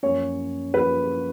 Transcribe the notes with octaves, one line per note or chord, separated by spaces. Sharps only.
F#2 F3 A#3 C#4 C#5
F3 A#3 C#4 B4